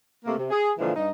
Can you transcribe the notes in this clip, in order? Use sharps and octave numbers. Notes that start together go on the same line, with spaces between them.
C3 A3 A#3
C3
G#4
A#2 D3 E3 F3 G#3
G2 D#4